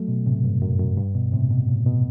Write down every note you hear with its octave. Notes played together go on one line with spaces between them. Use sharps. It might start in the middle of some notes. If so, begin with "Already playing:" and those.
Already playing: F#3 A3
B2
A2 C3
G2
F#2
F#2
G2
B2
A2 C3
B2
A2
B2